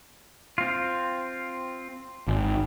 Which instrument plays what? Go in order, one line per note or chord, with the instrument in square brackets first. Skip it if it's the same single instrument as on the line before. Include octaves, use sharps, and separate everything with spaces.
[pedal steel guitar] C4 F4
[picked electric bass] G#1